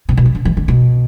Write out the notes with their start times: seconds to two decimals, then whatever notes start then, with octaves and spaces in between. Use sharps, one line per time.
0.09 C3
0.17 B2
0.25 F2
0.35 D3
0.45 E3
0.57 D3
0.68 B2